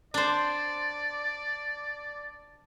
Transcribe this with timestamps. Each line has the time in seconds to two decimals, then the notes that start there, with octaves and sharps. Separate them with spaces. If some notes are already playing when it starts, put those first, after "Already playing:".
0.14 D4 C5 D5